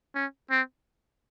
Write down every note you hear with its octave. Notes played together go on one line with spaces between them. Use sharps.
C#4
C4